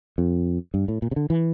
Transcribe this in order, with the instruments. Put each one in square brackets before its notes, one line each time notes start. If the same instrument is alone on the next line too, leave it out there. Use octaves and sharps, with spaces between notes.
[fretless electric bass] F2
G2
A2
A#2
C3
D3
E3